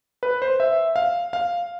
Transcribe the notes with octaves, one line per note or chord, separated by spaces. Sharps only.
B4
C5
E5
F5
F5